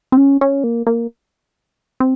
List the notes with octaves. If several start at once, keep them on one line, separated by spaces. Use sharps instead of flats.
C4
C#4
C#4
A#3
A#3
C4